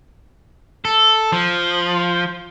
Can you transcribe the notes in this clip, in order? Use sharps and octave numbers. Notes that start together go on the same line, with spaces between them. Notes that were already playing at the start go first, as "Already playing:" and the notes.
A4
F3